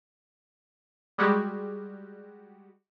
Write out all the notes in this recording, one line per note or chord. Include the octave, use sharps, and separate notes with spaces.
G3 G#3 F#4 G4